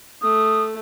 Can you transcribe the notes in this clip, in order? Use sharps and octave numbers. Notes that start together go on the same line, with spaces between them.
A3 D#6